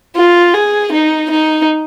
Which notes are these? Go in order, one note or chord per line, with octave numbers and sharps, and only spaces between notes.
F4
G#4
D#4
D#4